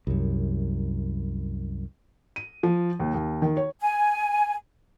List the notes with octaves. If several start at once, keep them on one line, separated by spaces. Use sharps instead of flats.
C2 F#2
D#7
F3
D#2
D#2
D#3
C#5
G#5